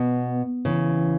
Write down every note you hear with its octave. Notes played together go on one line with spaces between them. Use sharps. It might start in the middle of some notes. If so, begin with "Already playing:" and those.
Already playing: B2 B3
C#3 E3